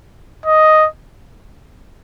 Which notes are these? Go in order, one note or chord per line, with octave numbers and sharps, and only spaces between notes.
D#5